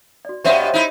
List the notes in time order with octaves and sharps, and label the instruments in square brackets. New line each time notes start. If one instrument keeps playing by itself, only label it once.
[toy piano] F#4 D5
[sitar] G2 B3 C5 [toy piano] C#5 E5
[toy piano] G4 D#5
[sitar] D#4 E4